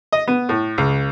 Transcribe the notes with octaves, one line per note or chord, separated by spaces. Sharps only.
D#5
B3
A2
C#2